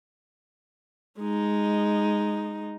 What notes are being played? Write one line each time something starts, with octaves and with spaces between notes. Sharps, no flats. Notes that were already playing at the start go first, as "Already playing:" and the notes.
G#3 D#4